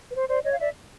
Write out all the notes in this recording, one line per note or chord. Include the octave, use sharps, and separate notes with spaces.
B4
C5
C5 D5
C#5 D#5
F5
D5 E5